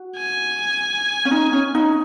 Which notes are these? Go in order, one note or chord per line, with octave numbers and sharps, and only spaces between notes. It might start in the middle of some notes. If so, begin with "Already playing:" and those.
Already playing: F#4
G#5
C#4
D#4
C#4
D#4